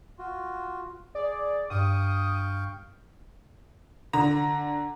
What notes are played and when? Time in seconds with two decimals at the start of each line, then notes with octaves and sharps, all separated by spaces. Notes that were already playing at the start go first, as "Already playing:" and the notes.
0.18 F4 F#4
1.15 G#4 D5
1.70 G2 F5 G5 C#6 D#6
4.13 D3 A#5